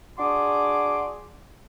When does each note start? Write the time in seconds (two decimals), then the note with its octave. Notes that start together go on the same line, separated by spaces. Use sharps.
0.19 D4 F#4 G#4 C6 D6